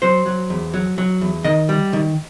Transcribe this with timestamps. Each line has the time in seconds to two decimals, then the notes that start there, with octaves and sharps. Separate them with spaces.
0.02 F#3 C5
0.26 F#3
0.50 E2
0.74 F#3
0.98 F#3
1.21 E2
1.44 D#3 D#5
1.69 G3
1.93 D#3